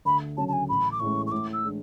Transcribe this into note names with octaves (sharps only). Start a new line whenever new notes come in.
D2 B5
C#3 F#3 C#4 A5
A5
G#5
A1 B5
D6
A2 E3 G#3 C#4 C#6
C#6
A2 D6
E6
E3 G#3 D4